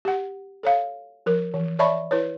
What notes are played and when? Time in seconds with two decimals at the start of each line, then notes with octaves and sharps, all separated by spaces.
0.05 G4 F#5
0.63 A4 C#5 F5
1.26 F3 A#4
1.54 E3
1.79 C#5 D5 E5 A5 B5 C#6
2.11 E4 B4 C#5